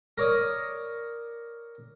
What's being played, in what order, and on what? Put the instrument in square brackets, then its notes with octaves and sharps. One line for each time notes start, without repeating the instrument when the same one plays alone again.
[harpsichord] A#4 C#5 D5 D#6